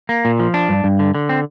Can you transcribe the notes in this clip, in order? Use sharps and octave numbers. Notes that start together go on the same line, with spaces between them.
A#3
A#2
F3
D4
G2
G2
D3
D3
C4